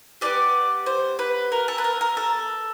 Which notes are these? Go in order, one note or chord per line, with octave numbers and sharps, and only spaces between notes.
B3 D4 G4 D5
C5
B4
A#4
A4
B4
A#4
A#4
A4